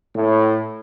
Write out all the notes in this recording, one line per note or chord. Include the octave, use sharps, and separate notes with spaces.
A2